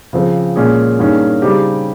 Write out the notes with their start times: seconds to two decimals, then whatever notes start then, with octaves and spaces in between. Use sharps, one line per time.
0.13 C#3 F3 C4
0.56 A#2 G#3 C#4 G#4
0.99 G2 D#3 A#3 C#4 G#4
1.42 C#3 G3 C4 D#4 G4